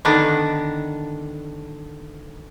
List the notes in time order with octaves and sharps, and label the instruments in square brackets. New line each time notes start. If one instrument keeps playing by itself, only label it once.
[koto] D3 D#3 B3 D4